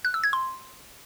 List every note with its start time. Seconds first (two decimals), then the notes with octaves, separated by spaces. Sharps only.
0.05 F#6
0.14 E6
0.24 G#6
0.33 C6